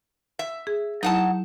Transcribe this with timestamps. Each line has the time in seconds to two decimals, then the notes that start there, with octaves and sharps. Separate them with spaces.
0.39 E5
0.67 G#4
1.03 F#3 D#4 E4 F#5 A5